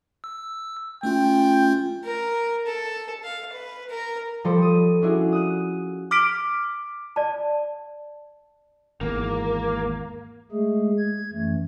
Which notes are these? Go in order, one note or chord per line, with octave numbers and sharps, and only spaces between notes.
E6
A3 C#4 F4 G5
A#4
A4
F5
B4
A#4
F3 G3 A4 B4 C5 D5
D#6
C#4 D4 E4 F#4 G#4
D#6 F#6
D6 F6 B6 D7
D5 A5
G#1 E2 A#3
G#3 A3 G#4
G#6
F#2 E3 A3